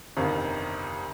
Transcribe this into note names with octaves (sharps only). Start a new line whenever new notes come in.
G1 F2 C3 D#3